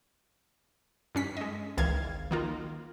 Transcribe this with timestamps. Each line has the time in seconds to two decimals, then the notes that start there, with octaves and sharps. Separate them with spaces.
1.15 G2 C#4 B6
1.37 G#3 D#5
1.77 G#1 C#2 D#3 E3 F5 G#6
2.31 D#3 A#3 F4